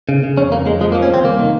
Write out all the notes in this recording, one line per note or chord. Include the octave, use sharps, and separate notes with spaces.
C#3
C#3
F2 C#4
F2 A#3
F2 G#3
F3 G#3
A#3
F3
C#4
D#2 C4
C2 A#3
D#3